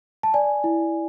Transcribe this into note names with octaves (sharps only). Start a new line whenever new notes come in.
A5
D5 G#5
E4